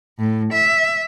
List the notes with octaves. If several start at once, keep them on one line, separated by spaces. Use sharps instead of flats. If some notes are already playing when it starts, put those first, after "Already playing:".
A2
E5